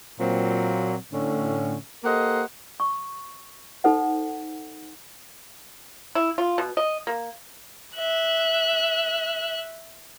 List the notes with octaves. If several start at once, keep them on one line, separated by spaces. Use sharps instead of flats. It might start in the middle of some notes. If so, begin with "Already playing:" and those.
A#2 F#3 C4
A2 D3 C#4
A#3 G4 A4 C5 D#5 F#5
C#6
D#4 A4 C5 F#5
E4
F4
B2
D#5
A#3
E5 F#6